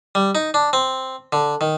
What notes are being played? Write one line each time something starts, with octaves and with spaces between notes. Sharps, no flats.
G3
D#4
D4
C4
D3
D#3